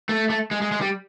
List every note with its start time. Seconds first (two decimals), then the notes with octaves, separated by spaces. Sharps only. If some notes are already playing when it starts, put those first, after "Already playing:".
0.09 A3
0.30 A3
0.51 G#3
0.62 G#3
0.72 G#3
0.81 G3